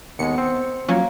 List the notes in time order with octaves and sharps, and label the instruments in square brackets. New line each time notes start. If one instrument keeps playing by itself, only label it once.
[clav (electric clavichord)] D#2 G#3 [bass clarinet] B3 [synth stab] C#7
[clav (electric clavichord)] C4
[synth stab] F3 F#3 C#4 [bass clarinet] A#3